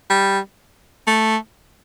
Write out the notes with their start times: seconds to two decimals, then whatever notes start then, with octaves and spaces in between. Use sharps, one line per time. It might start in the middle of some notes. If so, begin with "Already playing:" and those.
0.10 G3
1.07 A3